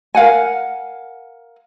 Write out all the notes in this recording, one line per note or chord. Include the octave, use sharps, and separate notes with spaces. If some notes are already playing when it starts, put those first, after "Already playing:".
A#4 F5 F#5 G#5